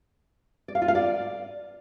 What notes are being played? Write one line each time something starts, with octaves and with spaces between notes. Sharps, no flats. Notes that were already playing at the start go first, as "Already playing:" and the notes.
D5
F5
F4
F5
D5